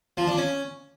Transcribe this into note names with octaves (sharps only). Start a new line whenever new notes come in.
F3
D4
C#4